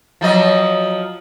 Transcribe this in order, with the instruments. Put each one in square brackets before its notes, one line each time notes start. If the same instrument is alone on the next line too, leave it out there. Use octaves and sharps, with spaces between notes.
[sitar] F3 F#3 D#5